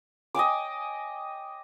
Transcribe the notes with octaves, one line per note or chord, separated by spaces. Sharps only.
D#5 G5 G#5 D6